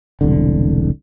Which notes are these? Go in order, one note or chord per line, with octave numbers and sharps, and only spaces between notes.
E1 C2 D3